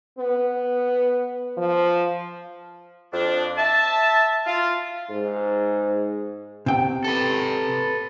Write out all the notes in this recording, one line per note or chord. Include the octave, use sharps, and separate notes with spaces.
B3
F3
F2 D4
E5 A5
F4
G#2
C3 G5
A4 B4